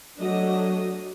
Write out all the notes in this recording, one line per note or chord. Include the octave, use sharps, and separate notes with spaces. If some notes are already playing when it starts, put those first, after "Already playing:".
F#3 A3 D4 D#5